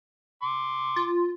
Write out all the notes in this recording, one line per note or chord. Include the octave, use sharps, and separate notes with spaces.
C6 D6
F4